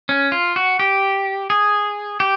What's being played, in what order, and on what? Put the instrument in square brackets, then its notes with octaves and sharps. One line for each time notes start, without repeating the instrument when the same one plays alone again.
[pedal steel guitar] C#4
F4
F#4
G4
G#4
G4